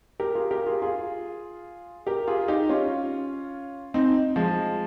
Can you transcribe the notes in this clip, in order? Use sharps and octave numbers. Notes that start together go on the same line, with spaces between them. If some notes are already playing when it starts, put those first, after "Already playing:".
G4 A#4
F4 G#4
G4 A#4
F4 G#4
F4 G#4
G4 A#4
F4 G#4
D#4 G4
C#4 F4
C4 D#4
F3 G#3